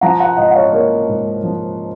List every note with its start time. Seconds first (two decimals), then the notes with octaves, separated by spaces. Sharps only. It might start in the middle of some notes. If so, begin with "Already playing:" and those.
0.01 F3 F#5 A#5
0.20 F#5 A#5
0.37 G#2 D#5 F#5
0.51 F#5
0.55 C#5 F5
0.73 A#3 A#4 C#5
1.08 G#2
1.43 F3